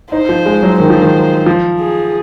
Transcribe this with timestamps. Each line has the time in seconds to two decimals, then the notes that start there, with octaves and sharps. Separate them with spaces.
0.12 D#4 C5
0.29 F3
0.46 G#3
0.63 F#3
0.79 D#3 C5
0.90 F3
1.01 D#3
1.46 F3
1.80 G#4